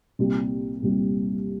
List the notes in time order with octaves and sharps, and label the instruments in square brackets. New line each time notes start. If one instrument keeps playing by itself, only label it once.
[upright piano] C2 A#2 G3
C2 A#2 G3